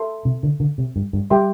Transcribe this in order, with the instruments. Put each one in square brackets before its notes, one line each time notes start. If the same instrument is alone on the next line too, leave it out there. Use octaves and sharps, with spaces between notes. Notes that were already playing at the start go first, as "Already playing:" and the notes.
Already playing: [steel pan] A4 E5 A5 C6
[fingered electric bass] C3
D3
D3
C3
G2
G2
[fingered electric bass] G3 [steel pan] G4 E5 G5 C6